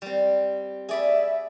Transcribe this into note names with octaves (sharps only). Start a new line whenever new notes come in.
G3 C4
G#4 D5 E5 B5